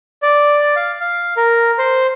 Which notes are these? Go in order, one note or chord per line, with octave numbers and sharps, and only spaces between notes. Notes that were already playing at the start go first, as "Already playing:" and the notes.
D5
F5
F5
A#4
C5